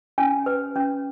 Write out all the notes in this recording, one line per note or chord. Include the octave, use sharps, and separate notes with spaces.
C#4 G#5
B4
C#4